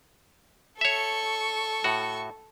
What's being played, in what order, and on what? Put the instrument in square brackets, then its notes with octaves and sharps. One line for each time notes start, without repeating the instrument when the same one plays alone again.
[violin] A4 C#6 [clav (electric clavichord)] C#5 E5
[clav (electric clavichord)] A2 F#4